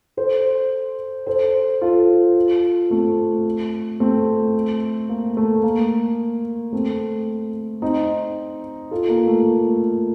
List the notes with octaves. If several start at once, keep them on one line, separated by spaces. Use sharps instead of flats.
A4 C5
A4 C5
F4 A4
A3 C4
A3 C4
A#3
A3
A#3
A3 C4
C4 D#4
F4 A4
A#3
A3